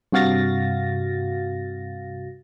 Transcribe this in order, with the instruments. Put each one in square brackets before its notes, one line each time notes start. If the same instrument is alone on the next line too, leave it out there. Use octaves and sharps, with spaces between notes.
[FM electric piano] G2 C3 F#4 F5 A6 A#6